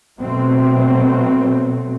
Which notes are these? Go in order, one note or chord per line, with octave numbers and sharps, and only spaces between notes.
B2 F#3 A3 C4